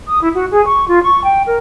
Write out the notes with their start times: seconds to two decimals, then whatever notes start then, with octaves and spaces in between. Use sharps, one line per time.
0.07 D#6
0.21 E4
0.34 F#4
0.50 G#4
0.65 C#6
0.87 F4
1.01 C#6
1.23 G5
1.45 A#4